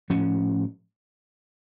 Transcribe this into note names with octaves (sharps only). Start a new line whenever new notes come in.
A2 F3 C#4